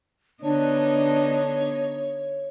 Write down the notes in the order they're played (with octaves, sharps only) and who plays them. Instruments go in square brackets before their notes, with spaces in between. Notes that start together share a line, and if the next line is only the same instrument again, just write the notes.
[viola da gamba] D3 B3 D#4 [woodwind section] D4 [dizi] C#5